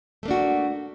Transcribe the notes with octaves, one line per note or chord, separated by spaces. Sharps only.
A3 A#3 D4 F#4